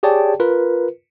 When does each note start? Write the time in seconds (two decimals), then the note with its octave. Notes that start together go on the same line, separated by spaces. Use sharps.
0.03 G4 G#4 C#5 D5 G5 A5
0.40 F4 A#4 B4